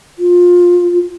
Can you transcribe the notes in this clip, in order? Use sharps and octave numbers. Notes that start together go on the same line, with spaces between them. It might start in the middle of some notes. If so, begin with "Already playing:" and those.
F4